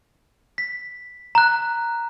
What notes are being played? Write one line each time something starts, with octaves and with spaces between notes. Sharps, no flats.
B6
A#5 F#6